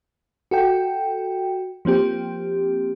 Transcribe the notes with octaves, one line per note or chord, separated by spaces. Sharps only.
F#4 A4 G5
F3 A#3 C4 G4